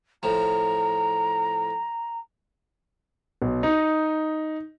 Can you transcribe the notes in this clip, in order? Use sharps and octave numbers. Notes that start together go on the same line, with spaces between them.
A2 F3 A#5
B1
D#4